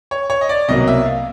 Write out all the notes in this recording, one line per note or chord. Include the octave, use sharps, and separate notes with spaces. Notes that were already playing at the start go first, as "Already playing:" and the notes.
C#5
C#5
D#5
D5
C2 B2 F#3 A#3 D#5
E5
F5